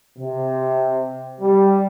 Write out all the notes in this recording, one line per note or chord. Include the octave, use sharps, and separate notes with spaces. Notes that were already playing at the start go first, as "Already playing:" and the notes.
C3
G3